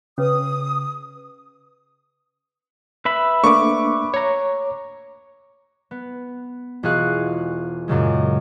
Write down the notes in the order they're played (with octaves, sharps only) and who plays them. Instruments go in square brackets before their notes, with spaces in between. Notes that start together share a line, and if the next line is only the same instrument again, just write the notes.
[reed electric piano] C#3 [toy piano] C#4 G#4 B4 [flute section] D#6
[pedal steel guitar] B4 E5 B5
[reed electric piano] A3 A#3 D4 [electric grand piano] C#6 D6
[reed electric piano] C#5 A#5
[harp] B3
E1 F4 F#4 G#4 F5 F#6
F#2 A#2 C#3 G#3